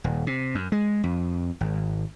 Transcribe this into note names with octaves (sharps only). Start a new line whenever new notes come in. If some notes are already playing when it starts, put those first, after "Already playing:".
D#1
C3
F#2
G#3
F2
G#1